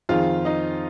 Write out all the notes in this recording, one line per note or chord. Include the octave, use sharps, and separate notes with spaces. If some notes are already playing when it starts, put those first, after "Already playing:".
F2 D#3 C4 F4 G#4 F5
D#4 D#5